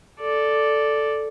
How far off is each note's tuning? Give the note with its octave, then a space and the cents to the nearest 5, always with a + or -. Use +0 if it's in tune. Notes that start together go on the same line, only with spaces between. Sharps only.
A4 +0 D5 +0